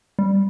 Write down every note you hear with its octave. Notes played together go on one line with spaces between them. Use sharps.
G3